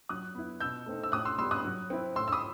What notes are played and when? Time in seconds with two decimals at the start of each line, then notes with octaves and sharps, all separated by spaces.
0.09 F#3 D#6 F#6
0.35 B3 E4
0.60 B2 E6 G6
0.86 A3 C4 D#4
1.03 E6
1.12 A2 D#6 F#6
1.25 C6 E6
1.38 G3 B3 C6 E6
1.51 D#6 F#6
1.65 F#3
1.90 C4 E4
2.16 A2 C6 E6
2.28 E6
2.33 B5 D#6